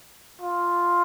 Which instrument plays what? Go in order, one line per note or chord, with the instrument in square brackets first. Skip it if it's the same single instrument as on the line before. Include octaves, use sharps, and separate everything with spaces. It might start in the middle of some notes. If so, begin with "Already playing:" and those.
[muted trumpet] F4